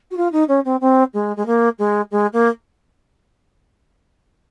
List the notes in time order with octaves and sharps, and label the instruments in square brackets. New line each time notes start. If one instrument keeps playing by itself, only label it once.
[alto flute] F#4
F4
D#4
C#4
C4
C4
G#3
G#3
A#3
G#3
G#3
A#3